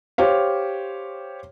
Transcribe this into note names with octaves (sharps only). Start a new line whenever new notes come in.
G4 C5 C#5 F5